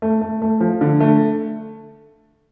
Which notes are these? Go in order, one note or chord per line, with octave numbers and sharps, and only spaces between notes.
A3
A3
A3
F3
D3
A3